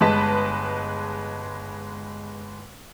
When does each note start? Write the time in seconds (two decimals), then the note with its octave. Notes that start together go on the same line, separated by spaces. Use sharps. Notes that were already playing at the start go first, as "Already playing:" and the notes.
0.01 G1 G#3 B4 D#5 A5 B6